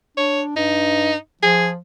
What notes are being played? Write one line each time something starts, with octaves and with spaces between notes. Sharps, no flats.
D4 C#5
G2 D#4
F3 G#4